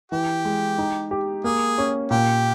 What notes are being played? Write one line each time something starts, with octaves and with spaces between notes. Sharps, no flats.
E3 G4
G#3
D#4
G4
A#3 G#4
C#4
A#2 G4